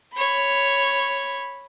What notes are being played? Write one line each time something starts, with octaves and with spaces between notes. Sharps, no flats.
C#5 B5